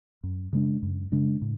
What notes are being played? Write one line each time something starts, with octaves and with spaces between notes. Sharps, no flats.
F#2
C#3 G#3 D4
F#2
C#3 G#3 D4
A2